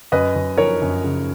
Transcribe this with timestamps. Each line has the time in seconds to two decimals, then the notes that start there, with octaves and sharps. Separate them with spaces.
0.12 F#2 B4 D#5
0.35 F#2
0.58 F3 A#4 C#5
0.82 F#2
1.04 C#3